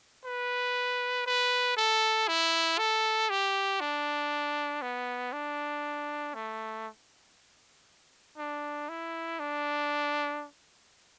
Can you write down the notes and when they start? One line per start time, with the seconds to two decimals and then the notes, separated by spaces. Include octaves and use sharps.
0.25 B4
1.26 B4
1.77 A4
2.28 E4
2.78 A4
3.30 G4
3.80 D4
4.82 B3
5.33 D4
6.34 A3
8.38 D4
8.89 E4
9.40 D4